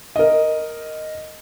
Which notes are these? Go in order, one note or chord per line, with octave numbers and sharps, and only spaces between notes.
A#4 D#5